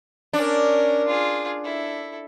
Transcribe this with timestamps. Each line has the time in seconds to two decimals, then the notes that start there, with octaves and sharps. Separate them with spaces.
0.33 C#4 D4 A#4
1.07 F4 G#4
1.64 E4 A4